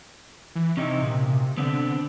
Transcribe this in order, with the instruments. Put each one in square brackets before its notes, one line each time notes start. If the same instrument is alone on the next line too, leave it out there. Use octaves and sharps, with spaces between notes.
[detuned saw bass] E3
[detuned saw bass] C3 [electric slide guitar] C#4 D#4 E4
[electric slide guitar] A#2 C#3
[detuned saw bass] D3 [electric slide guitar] B3 C4 D4